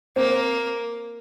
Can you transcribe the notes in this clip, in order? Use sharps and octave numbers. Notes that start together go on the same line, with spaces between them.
A#3 C4